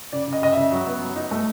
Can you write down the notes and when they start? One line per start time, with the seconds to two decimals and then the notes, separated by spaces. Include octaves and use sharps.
0.13 C#3 D5
0.28 C#3 D#5
0.42 C#3 D#5
0.52 C#3 E5
0.72 F#3
0.87 B3
1.01 F#3
1.16 D#4
1.31 A3